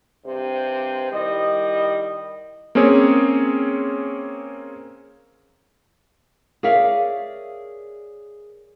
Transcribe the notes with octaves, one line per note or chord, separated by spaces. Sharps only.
G2 C3 C5
D#3 G3 E4 D#5
A#3 C4 C#4 G#4 C#5
G#4 A#4 C#5 D5 E5 F5